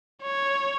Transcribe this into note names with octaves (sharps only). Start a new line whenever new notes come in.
C#5